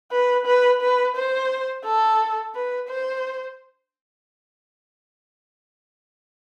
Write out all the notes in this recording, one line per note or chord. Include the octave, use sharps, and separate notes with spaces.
B4
B4
B4
C5
A4
B4
C5